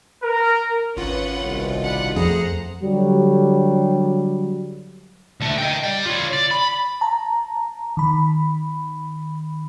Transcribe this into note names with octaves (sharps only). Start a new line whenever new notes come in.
A#4
G#1 C#4 F4 B4 F#5
C2 B2
D4 F#5 B5
F2 A3 G#4 C5 F#5 A#5
D3 F#3 G3
D2 A3
D#5 G5
D5 G5
F4 C#5
D5
B5
A5 A#5
D#3 B5